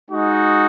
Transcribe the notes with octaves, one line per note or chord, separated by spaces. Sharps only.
G#3 D#4 F#4